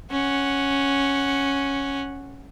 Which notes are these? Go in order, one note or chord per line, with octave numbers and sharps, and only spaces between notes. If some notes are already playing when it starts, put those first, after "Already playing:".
C#4 F#5